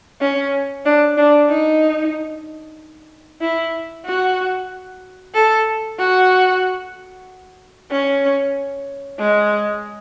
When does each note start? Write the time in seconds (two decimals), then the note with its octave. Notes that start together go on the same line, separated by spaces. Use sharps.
0.21 C#4
0.85 D4
1.17 D4
1.50 D#4
3.42 E4
4.06 F#4
5.35 A4
5.99 F#4
7.91 C#4
9.19 G#3